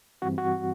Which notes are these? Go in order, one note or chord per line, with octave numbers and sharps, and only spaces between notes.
G2 E3 G3 C4 F#4
F#4